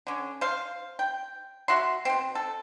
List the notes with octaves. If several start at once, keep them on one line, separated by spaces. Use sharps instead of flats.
D3 C#4
C5 F5
G5
F#4 E5 F#5 C6
B2 C4
A4